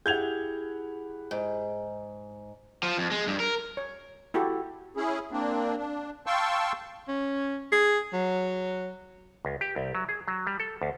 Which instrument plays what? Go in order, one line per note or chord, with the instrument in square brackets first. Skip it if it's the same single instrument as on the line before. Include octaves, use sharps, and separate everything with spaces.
[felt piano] E4 G4 F#5 [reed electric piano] G#4 [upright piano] G6 G#6 F7
[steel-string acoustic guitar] G#2
[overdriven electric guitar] F3
F2
G#3
G2
A#4
[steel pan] C#5
E4 F#4 G4 A4
[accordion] C#4 E4 G#4
A#3 C4 D4
D4
F5 G5 A5 C6 C#6 E6
[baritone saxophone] C#4
G#4
F#3
[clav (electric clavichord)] C#2
G4
C2
F#3
G#4
F#3
G3
A4
D2